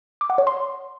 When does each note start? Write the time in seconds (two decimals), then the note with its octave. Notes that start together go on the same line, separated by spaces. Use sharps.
0.21 D6
0.30 F#5
0.38 C#5
0.47 C6